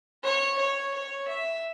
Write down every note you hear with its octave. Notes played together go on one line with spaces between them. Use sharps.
C#5
C#5
C#5
E5